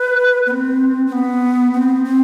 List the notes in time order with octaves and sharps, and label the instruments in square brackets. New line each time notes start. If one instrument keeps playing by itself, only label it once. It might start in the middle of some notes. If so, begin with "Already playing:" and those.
Already playing: [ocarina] B4
B3
C4
C4
B3
C4
C4